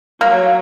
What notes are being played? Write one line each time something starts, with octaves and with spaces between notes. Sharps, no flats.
F#3 A#3